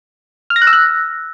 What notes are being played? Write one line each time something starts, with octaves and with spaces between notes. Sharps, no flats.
F6
A#6
F#6
E6
F#6